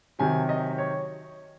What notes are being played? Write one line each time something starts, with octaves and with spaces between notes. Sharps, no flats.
C3 D#3 F#3 G#5
D#5
C#5